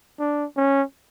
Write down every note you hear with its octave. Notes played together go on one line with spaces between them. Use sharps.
D4
C#4